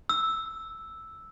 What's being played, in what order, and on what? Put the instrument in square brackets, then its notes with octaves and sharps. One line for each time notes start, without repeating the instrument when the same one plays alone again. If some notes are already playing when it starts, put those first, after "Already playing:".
[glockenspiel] E6